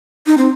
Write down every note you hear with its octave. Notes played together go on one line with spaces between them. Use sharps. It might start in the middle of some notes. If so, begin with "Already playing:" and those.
D#4
C4